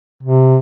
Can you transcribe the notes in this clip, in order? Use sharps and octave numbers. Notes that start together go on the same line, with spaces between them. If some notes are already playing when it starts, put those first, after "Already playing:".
C3